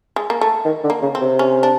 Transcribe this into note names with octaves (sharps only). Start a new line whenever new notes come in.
G#3
A#3
A3
D#3
D3
A#3
C#3
C4
C3
C#4
D4